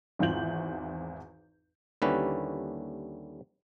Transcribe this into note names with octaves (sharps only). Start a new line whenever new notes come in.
G#1 E2 E4 F4 G6 F#7
D#2 D3 G3 C#4 E4 B4